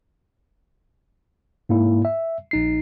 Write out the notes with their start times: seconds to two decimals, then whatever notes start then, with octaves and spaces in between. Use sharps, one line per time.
1.69 G#2 A#3 E4
2.05 E5
2.51 A#1 D#4 C7